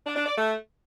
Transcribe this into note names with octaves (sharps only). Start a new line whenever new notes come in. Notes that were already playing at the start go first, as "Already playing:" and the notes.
D4
D4
D5
A3